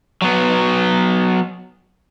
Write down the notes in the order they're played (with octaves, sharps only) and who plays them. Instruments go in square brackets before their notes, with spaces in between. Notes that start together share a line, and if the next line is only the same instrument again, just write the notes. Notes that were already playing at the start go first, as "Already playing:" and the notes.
[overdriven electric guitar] F#3 B3